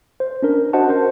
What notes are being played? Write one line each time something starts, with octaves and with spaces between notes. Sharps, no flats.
C5
C#4 D4 A#4
F#4 C5 D#5 F#5 A5
A#4 C5